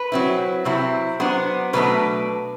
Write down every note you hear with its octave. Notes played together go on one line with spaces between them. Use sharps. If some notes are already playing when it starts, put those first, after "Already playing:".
Already playing: B4
F#3 C4 E4
C3 F#3 C4 E4
F#3 B3 D4 C5
B2 F#3 A3 D4 B4